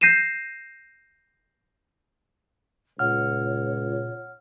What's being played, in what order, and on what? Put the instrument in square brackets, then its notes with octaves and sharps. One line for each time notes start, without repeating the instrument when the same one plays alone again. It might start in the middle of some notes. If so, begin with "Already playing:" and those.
[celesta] G6 A#6 C7 D#7 E7
[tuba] C#2 [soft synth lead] A#2 [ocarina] C#5 [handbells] F#5 F6